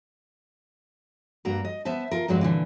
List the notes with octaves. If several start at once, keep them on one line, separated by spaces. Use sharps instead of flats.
G2 A#3 F#4 A#5
D#5
B3 C5 E5 A5
F4 A#4
E2 G2 F#3 G#3 F#4
A#2 D3 E3